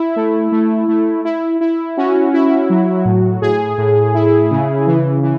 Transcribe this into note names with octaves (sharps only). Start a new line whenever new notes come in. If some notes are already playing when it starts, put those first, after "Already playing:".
Already playing: E4
A3
A3
A3
E4
E4
C#4 F#4
E4
F#3
A2
A2 G#4
A2
E4
C#3
E3
E3